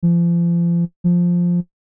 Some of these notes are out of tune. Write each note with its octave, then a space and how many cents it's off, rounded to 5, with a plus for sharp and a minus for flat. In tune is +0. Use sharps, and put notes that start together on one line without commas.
F3 -35
F3 +5